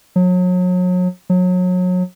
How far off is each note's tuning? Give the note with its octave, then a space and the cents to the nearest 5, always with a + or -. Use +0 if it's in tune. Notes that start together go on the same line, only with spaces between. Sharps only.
F#3 -35
F#3 -30